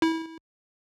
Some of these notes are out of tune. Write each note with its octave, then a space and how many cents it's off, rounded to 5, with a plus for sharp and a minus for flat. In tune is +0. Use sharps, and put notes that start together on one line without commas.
E4 -25